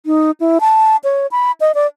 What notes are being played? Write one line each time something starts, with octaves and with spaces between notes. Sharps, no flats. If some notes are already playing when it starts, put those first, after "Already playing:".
D#4
E4
A5
C#5
B5
D#5
D5